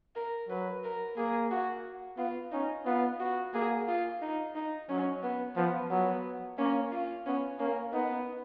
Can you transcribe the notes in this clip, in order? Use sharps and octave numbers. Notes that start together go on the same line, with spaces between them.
A#4
F#3 B4
A#4
A#3 G#4
F#4
B3 F4
C#4 D#4
B3 F4
F#4
A#3 G#4
F4
D#4
D#4
F#3 C#4
B3
F3 B3
F#3 B3
A#3 C#4
F4
B3 C#4
A#3 C#4
B3 D#4